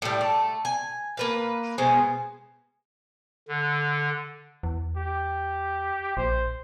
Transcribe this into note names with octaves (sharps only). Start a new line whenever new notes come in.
A2 G3
A3
G#5
A#3 B4 F5
B2 G#3 C5 G#5
D3
E2
G4
A#1 C5